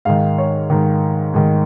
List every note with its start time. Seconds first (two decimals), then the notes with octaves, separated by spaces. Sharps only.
0.05 G#2 D#3 F5
0.38 C#5
0.70 G#2 D#3
1.34 G#2 D#3